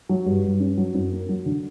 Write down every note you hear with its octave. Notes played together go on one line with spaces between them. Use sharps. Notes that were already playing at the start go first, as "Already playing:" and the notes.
F#3
G2
G2
C#4
F#3
F#2
A#3
F#3
D3